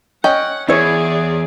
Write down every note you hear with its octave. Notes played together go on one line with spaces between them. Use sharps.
C#4 D#5 F#5 G5
E2 E4 G#4 C#5 D5